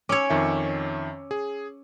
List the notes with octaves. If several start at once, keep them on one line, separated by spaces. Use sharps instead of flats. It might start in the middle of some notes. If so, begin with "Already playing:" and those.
C#4 C#5 D6 E6
F2 D#3 E5
G#4